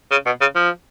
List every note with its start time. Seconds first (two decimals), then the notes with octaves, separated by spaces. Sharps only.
0.11 C#3
0.26 B2
0.41 C#3
0.56 F3